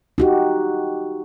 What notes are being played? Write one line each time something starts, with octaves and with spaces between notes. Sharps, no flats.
D#4 F#4 G4